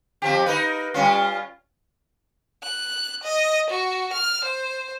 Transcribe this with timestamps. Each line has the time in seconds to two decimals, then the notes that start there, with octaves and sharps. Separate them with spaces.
0.22 F2 F3 G4
0.46 D#4 A#4 B4
0.94 G3 C#4 F4
2.64 F#6
3.23 D#5
3.70 F#4
4.13 F6
4.44 C5